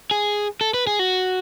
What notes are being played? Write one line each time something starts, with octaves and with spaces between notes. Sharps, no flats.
G#4
A4
B4
G#4
F#4